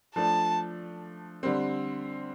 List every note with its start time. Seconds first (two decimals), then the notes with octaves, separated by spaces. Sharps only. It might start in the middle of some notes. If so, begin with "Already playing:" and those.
0.15 F3 A3 D4 A5
1.43 D3 G3 C4